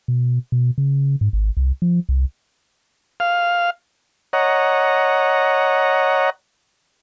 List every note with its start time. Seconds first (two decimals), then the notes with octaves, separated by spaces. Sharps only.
0.08 B2
0.52 B2
0.78 C#3
1.21 G#2
1.33 G#1
1.57 C2
1.82 F3
2.09 C2
3.20 F5
4.33 C#5 D#5 F#5 A#5